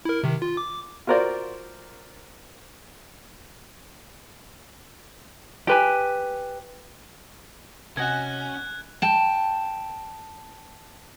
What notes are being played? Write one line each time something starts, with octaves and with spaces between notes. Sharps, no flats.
E4 A#4
C3 D#3
F4
D6
F4 F#4 A#4 C5 D5
G4 B4 G#5
C3 C#4 F#4 D#5 G#5 F#6 G#6
G5 A5